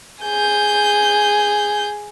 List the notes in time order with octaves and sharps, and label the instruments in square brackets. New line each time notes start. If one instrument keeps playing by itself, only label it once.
[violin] G#4 G6